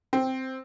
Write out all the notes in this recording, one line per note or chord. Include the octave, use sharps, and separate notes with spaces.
C4